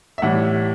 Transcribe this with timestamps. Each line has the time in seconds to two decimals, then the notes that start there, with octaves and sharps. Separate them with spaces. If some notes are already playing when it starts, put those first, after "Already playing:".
0.18 E5
0.22 A2 E3 G3 F#5